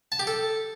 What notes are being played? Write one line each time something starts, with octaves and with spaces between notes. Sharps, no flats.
A5
G4
A4